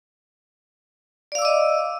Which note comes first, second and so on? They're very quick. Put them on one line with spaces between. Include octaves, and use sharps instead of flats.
D5 F5 E6 D6 D#5